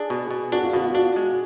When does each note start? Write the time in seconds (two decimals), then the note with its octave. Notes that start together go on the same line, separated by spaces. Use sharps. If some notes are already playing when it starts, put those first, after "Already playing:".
Already playing: D4 G#4
0.10 B2
0.31 B2
0.52 D4 F#4
0.63 F4
0.73 B2 F#4
0.86 F4
0.95 D4 F#4
1.16 G#3